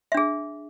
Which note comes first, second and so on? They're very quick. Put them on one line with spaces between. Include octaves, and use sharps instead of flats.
E5 D4 G#4